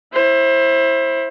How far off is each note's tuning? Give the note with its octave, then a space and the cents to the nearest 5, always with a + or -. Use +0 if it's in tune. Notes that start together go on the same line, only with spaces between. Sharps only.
E4 +0 C5 +30